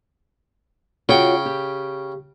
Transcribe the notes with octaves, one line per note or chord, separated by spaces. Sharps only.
C#3 F4 F#4 C#5 G5
G4